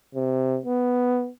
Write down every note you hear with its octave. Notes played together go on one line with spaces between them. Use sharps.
C3
B3